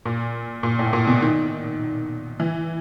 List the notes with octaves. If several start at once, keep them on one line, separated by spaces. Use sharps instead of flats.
A#2
A#2
A2
A#2
B2
D#3
E3